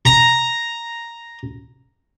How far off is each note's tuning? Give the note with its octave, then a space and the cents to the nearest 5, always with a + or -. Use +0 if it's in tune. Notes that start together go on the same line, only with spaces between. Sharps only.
A#5 +0